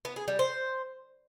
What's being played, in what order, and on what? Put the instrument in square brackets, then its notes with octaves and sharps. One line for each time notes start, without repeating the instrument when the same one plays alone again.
[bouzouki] B3
G#4
G3
C5